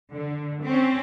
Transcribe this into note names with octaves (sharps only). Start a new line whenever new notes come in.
D3
C4 C#4